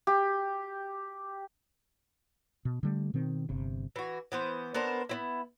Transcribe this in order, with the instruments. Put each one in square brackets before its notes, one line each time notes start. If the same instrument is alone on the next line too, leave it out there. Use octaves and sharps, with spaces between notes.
[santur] G4
[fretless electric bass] B2
D3 G3 A3
B2 D#3 C4
G1 C3
[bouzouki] E3 F#4
E3 B3 C5
B3 D4 A#4 C5
B3 C4 E4